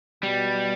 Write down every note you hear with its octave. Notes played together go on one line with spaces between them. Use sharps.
B2 G3